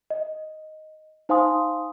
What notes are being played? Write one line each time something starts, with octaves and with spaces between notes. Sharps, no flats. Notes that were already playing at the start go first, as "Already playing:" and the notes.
D#5
D#4 C5 F5 G#5 C6 D#6